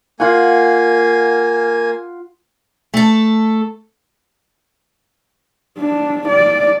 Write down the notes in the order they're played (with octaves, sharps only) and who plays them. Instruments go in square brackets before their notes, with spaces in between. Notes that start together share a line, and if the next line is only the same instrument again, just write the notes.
[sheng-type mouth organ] A#3 G#5 [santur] F4 F#5
[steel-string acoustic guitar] A3 A4
[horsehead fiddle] D4
D5